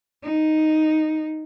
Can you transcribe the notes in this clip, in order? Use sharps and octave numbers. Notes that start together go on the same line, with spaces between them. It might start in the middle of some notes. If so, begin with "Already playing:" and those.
D#4